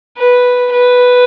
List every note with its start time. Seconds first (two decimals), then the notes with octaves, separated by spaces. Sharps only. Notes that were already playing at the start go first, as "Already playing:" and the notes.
0.17 B4
0.72 B4